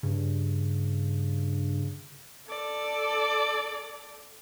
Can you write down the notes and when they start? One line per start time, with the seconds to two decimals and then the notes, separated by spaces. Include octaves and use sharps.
0.03 G2 C#3
2.47 A4 D5